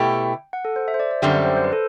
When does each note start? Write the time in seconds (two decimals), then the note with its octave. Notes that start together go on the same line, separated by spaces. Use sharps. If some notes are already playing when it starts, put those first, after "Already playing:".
Already playing: B2 A3 E4 G4 G5
0.53 F#5
0.65 A4
0.76 C5
0.88 E5
0.94 C5
1.00 D5
1.11 D5
1.22 F#2 D3 G3 C4 E5
1.34 D5
1.45 C5
1.57 C5
1.64 B4
1.73 A4